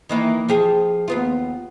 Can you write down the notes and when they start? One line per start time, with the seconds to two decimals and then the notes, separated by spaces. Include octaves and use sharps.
0.09 D#3 E3 A#3
0.49 F3 G4 G#4
1.08 D#2 B3 F4